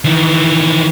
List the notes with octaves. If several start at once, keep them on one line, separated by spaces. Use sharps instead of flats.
D#3 E3